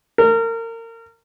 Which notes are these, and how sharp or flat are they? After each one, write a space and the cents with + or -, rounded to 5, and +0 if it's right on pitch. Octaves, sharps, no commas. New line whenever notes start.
A#4 -30